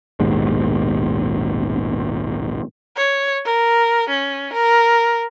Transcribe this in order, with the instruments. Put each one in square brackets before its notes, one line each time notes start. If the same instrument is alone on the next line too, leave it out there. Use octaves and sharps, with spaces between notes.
[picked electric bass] A#1 D#2 G#2 B2
[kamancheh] C#5
A#4
C#4
A#4